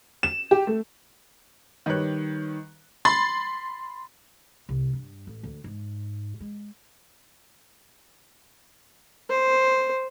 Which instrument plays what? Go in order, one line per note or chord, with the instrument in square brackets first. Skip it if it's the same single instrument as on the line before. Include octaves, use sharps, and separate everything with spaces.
[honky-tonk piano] E7
G4
A3
[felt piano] D#3 G3 B4 C#5 F#6
[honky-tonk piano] B5 C6 A6
[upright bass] C2
G2
A1
D2
G#2
G#3
[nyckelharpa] C5